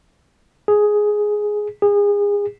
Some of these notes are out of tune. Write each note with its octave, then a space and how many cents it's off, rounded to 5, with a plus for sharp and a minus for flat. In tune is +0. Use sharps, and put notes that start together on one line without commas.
G#4 +5
G#4 -30